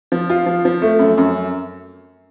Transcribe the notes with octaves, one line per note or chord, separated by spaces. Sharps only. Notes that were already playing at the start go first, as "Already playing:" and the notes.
F3
F4
F3
F3
A3
F#2
F#2